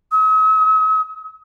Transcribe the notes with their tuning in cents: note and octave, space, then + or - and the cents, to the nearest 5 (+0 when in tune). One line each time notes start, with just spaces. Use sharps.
D#6 +45